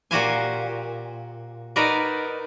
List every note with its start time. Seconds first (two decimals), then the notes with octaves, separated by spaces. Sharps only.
0.11 A#2 F#4 G4 C5 F5 G#5
1.76 D#4 F#4 A#4 B4 D5